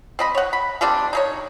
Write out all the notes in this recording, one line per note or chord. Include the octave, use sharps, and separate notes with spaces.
C4 D#5 B5
C#5 F#5
B5
D#3 G3 C4 D4
D#4 G#4 C#5